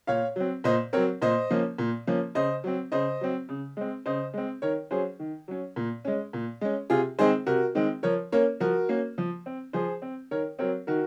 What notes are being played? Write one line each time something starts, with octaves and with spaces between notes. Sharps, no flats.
A#2 C#5 F5
F#3 C4
A#2 C5 D#5
F#3 C4 A#4 C#5
A#2 C5 D#5
F3 A#3 C#4
A#2
F3 A#3 C#4
C#3 C5 D#5
F#3 C4
C#3 C5 D#5
F#3 C4
C#3
G#3 C4
C#3 C5 D#5
G#3 C4
D#3 A#4 C#5
F#3 C#4 G#4 C5
D#3
F#3 C#4
A#2
G#3 C#4
A#2
G#3 C#4
C3 F4 G#4
D#3 G#3 C4 G#4 C5
C3 F#4 A#4
D#3 G#3 C4
F3 A#4 C#5
A#3 C#4 A#4 C#5
F3 F#4 A#4
A#3 C#4
F3
C4
F3 G#4 C5
C4
D#3 A#4 C#5
F#3 C4 A#4 C#5
D#3 F#4 A#4